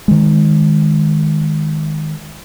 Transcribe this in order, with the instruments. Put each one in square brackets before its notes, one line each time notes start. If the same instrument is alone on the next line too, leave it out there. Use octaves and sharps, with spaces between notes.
[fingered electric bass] D#3 G#3